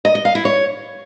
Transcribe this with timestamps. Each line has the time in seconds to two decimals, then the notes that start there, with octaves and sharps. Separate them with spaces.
0.05 D#5
0.15 D#5
0.25 F5
0.35 E4
0.45 C#5